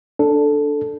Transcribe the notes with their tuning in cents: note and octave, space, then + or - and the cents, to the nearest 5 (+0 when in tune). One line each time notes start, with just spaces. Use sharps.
D4 +0 A4 +0